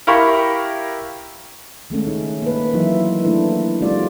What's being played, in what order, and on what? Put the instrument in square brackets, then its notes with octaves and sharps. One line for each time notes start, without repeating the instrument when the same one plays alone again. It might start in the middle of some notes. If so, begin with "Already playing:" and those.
[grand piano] E4 G4 A#4 F5 B5 C#6
[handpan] D#3 G#3 A3 C#4
D#4
A#3 B4
E3 F#3 D#4 F4 E5
A3 A#3 D4 E4 B4
G#3 A#3 C#4 F4 F#4 D5